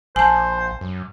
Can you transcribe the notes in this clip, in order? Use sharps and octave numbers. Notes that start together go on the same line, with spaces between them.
A#1 C5 G#5 A5
F#2